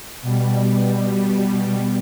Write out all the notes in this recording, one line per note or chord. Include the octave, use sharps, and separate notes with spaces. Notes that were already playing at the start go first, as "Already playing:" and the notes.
B2 G3